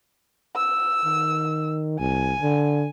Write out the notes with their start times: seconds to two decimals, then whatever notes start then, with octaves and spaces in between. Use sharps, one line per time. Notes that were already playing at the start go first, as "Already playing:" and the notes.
0.56 E6
1.05 D#3
2.00 C2 G#5
2.41 D3